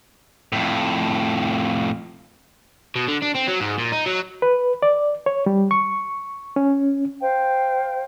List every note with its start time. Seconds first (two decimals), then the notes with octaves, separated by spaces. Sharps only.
0.52 F2 A2
2.96 B2
3.08 D3
3.22 D4
3.35 C4
3.47 F#3
3.60 G#2
3.78 A#2
3.92 D#4
4.06 F#3
4.42 B4
4.82 D5
5.26 C#5
5.46 G3
5.71 C#6
6.56 C#4
7.20 C5 F5 G5